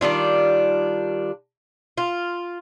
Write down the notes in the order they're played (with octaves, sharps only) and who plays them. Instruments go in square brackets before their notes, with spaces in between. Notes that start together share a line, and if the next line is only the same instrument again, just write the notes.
[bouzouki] D#3 G3 D4 F4
F4